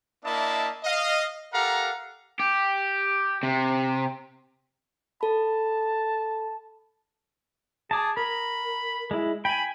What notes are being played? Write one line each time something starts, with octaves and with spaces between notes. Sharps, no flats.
A#3 D4 E4 D#5 E5 A5
D#5 F5
G4 A4 A#4 F5 F#5 A#5
G4
C3
A4 A5 B5
G#4 A5 D6
A#4 B5
G#3 E4
G5 G#5 B5